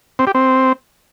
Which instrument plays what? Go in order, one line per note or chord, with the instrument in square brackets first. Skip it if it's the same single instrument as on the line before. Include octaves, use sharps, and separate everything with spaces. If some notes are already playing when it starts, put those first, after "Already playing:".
[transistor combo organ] C4
G4
C4